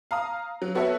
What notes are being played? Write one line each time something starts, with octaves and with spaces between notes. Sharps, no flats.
F5 A#5 D#6
F#3
B3 F#4 A4 C#5 E5 F#5